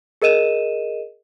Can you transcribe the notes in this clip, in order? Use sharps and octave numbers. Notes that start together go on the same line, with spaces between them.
G#4 A#4 D#5 D#7 E7